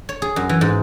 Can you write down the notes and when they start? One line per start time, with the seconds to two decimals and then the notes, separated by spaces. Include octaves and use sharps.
0.09 C#5
0.22 G#4
0.36 F#2
0.49 E3
0.61 G#2